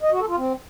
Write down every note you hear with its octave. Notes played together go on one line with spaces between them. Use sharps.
D#5
F#4
A4
F4
C4